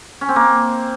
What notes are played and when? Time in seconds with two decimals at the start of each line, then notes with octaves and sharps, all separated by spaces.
0.21 C#4
0.29 C4
0.36 A#3